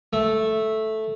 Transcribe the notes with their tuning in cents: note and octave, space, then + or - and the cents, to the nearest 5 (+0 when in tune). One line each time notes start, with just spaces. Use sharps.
A3 -5